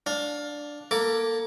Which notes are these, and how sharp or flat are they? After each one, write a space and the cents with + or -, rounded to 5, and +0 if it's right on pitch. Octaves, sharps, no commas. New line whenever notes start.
D4 +0 F5 +20
A#3 +20 A4 +35 D6 -10